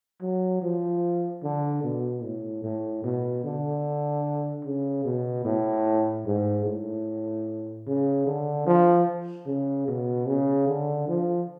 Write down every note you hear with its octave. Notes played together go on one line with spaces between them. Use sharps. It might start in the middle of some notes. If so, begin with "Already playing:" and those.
F#3
F3
D3
B2
A2
A2
B2
D3
C#3
B2
A2
G#2
A2
C#3
D3
F3
C#3
B2
C#3
D3
F3